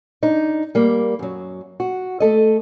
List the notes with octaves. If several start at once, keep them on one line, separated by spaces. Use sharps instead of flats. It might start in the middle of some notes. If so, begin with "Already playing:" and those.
D4 D#4
G3 A#3
F#2 F#3
F#4
A3 A4 D#5